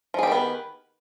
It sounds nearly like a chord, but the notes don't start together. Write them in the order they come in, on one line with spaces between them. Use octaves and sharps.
F3 G#4 G4 D#3 B3